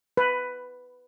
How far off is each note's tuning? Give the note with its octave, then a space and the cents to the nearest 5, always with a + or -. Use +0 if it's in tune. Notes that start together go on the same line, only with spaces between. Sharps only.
B4 +10